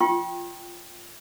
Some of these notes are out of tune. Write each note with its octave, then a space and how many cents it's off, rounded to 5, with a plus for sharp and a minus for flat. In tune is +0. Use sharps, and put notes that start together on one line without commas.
F4 -10 G5 +0 C#6 -45